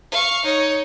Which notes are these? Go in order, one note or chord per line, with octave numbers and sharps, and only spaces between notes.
F5 C#6
D#4 C#5